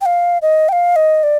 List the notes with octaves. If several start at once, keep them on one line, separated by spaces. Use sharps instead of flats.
G5
F5
D#5
G5
F5
D#5
D5